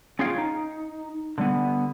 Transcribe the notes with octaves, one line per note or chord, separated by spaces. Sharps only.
C#4 F4 G#4 C#5 F5 G5
D#4
D3 G3 B3